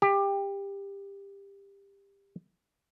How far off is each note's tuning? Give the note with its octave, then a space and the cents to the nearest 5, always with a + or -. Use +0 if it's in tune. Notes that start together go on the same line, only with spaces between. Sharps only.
G4 +20